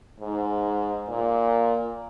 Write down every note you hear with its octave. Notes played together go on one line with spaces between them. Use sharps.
G#2
A#2